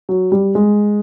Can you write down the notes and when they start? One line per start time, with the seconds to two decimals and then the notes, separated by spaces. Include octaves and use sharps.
0.09 F#3
0.32 G3
0.55 G#3